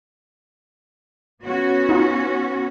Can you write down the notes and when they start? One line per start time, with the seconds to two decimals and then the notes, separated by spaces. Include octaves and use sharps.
1.43 B3 C#4 F#4
1.89 D#4 F4